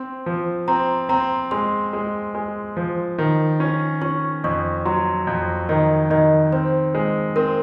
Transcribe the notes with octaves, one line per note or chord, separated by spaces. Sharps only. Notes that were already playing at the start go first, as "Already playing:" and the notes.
Already playing: C4 C6
F3
C4 A#5
C4 A#5
G#3 C6
G#3
G#3
F3
D#3
C#4
C#4 C#6
F2 C#6
F#3 C6
F2
D#3 D#5
D#3 D#5
C4 C5
G#3
C4 A#4